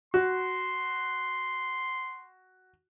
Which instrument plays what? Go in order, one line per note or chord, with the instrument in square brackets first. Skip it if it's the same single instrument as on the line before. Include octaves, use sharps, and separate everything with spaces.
[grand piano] F#4 [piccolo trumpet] C6